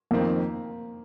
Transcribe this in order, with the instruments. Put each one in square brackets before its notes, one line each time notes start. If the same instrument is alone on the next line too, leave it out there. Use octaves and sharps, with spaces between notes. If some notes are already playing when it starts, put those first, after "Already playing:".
[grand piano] F2 D#3 C4 [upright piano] A#3